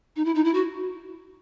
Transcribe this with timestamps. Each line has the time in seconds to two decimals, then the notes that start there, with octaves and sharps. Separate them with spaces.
0.16 D#4
0.25 E4
0.35 D#4
0.45 E4
0.54 F#4